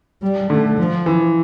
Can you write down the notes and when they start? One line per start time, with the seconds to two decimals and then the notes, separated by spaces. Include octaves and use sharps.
0.22 G3
0.50 D3 A3
0.78 F3
1.06 E3